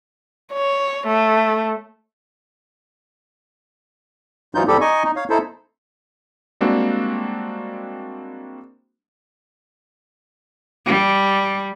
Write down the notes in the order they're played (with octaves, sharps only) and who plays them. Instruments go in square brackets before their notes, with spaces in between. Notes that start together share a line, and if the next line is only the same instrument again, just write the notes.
[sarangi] C#5
A3
[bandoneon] G#2 E3 F#3 D#4 F4 G6
E2 G#2 G3 G4 A4
D#4 D#5 G#5 C#6
D#4
C#5 F5
D#4 E4 A4 C5
[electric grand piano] G3 G#3 A#3 C4 D4 F#4
[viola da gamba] G3